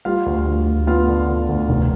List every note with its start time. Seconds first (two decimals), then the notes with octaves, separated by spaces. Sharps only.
0.05 G3 F4 F5
0.26 D2
0.46 D2
0.67 D2
0.87 B3 F4 F5
1.08 D3
1.28 D3
1.49 D2
1.69 F1